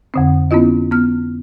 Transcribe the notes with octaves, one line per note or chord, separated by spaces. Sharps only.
F2 D3 C4
B3 C#4 E4 F4 D#5
B3 F6